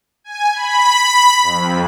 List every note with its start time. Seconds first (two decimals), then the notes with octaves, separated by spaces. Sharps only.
0.24 G#5
0.53 B5
1.43 F2